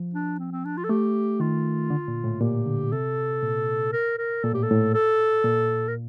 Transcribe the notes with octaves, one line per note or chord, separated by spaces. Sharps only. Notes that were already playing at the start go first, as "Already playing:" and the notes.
Already playing: F3
D4
C4
C4
D4
F4
A4
A3 G4
D#3 F4
D3
A#2
A2
A#2 G4
D3
C3 A4
A#2
A#4
A#4
A#2 A4
A2 G4
A4
A2
A4
A#2
A#4